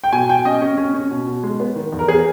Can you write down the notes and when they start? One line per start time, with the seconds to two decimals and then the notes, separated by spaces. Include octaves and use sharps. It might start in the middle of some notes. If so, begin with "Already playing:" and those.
0.04 G5
0.13 B2 G#5
0.29 B2 G5
0.45 C#4 D#5
0.62 C#4
0.78 C#4
0.94 C#4
1.11 B2
1.27 B2
1.43 G#3
1.60 B3
1.76 D#3
1.92 E2
1.99 A#4
2.08 B3 G#4